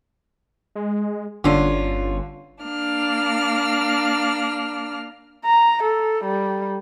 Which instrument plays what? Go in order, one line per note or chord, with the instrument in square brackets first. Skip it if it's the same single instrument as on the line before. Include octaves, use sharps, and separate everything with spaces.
[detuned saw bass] G#3
[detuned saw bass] G1 [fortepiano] D3 D4 [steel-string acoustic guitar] C#4 F4
[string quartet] A#3 D4 F6
[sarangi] A#5
A4
G3